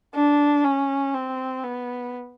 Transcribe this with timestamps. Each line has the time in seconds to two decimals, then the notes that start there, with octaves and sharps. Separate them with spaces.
0.15 D4
0.65 C#4
1.15 C4
1.64 B3